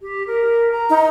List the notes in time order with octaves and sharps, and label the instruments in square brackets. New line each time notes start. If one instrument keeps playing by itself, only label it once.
[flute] G4
A#4
A#5
[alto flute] D#4